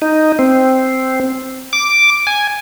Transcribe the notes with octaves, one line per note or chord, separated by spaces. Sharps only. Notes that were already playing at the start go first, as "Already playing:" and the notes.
D#4
C4
D6
G#5